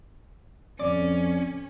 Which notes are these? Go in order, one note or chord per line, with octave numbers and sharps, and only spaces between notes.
F2 C#4 D5